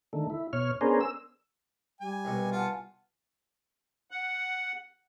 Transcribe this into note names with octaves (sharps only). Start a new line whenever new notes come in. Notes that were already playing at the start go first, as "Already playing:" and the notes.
D3 D#3 A3
E4
B2 C#5 F6
B3 C#4 D4 G#4 A#4 C5
E6
G3 G#5
C2 B2
F4 F#5 G#5 A5
F#5